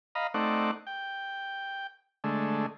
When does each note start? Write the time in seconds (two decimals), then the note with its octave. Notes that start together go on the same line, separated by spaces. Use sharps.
0.15 D#5 F5 A#5 B5
0.34 A3 C4 D#4 D5 F#5
0.87 G5
2.24 D3 G#3 A3